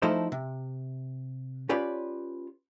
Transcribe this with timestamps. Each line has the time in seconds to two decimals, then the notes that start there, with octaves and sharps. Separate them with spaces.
0.02 F3 A3 D#4 E4 C5
0.32 C3
1.69 C#4 F4 G4 B4 C#5 D5